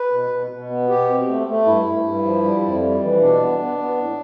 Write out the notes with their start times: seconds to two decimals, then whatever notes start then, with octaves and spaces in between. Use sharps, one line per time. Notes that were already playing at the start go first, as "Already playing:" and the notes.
Already playing: B4
0.11 B2
0.31 B2
0.51 B2
0.69 B3
0.89 B2 G4
1.08 C4
1.27 A3
1.47 A3
1.66 G2 E4
1.86 G2
2.05 G2
2.25 F3
2.43 G3
2.62 F2
2.82 G3
3.01 E3
3.20 B2 D4
3.40 B3
3.59 B3
3.79 B3
3.97 A2